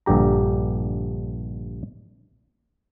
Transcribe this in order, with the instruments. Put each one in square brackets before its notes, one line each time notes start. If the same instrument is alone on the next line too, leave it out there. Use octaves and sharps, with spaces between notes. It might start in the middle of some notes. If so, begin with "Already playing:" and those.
[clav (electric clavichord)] A#1 G2 D3 G4 A#5